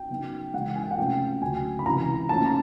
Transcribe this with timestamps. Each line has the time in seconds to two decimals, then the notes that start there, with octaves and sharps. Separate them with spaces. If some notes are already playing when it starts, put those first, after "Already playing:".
Already playing: G5
0.10 C#3 F#3 B3 D#4
0.54 C#3 E3 G#3 F#5
0.76 G#5
0.84 G5
0.91 F#5
0.98 C3 F3 A3 C#4 F4 G5
1.42 D2 C#3 F#3 G#5
1.79 B5
1.86 C#2 C3 E3 A#5
2.29 A#2 F3 A3 C#4 F4 A5
2.46 A#5